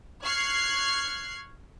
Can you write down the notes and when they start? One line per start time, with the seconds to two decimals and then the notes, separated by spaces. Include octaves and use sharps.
0.23 C#6 F6 F#6 G#6 C7